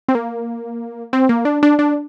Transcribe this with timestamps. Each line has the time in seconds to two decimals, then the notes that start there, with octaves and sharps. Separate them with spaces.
0.08 C4
0.15 A#3
1.13 C4
1.29 A#3
1.45 D4
1.63 D4
1.79 D4